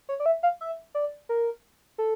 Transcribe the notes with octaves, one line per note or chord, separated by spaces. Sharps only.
C#5
D5
E5
F5
E5
D5
A#4
A4